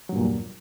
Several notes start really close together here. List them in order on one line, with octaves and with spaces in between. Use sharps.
F#3 G2 A#2 E2